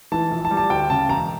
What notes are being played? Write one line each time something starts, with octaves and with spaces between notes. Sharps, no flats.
E3 A5
A#1
A5
G3
A5
D2 G5
C#3 A5
E1 A#5